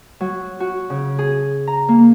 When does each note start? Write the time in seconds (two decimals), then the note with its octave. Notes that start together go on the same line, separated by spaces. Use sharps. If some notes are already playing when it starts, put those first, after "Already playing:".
0.21 F#3
0.60 F#4
0.90 C#3
1.19 G#4
1.67 A#5
1.89 A#3